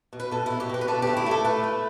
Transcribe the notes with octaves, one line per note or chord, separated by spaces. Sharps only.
B2
B4
B2 A4
B2 E4
G4
B2 B4
B4
D3 A4
A3 G4
E4
A3 A4
A3 B4
A3